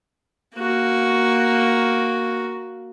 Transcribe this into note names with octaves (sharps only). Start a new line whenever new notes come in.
A#3 F#4